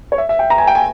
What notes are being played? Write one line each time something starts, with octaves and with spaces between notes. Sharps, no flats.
C#5
E5
E5
G5
A#5
G#5
G5
G#5